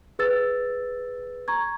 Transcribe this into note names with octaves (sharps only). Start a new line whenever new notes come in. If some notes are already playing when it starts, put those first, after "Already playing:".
G#4 B4 E6 A6
A#5 C#6 G#6